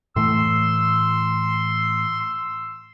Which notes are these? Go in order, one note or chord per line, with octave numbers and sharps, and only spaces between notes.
A2 E3 A3 C6 E6